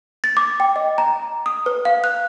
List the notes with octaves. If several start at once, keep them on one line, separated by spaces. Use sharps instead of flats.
A6
D6
G5
D#5
A#5
D#6
B4
F5
F#6